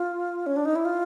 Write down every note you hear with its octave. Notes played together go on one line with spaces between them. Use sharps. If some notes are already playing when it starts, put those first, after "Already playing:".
Already playing: F4
C#4
D4
D#4
E4
F4